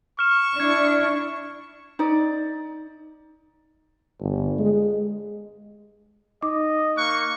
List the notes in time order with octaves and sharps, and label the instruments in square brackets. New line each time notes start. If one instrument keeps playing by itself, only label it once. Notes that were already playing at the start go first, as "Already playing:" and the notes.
[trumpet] C#6 [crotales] F6 E7
[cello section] D4 E4 [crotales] G#6 E7
[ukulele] D#4 D5
[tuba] G1
G#3
[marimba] D#4 D6 [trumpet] D#5
[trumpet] A#3 [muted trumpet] C#6 [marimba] F#6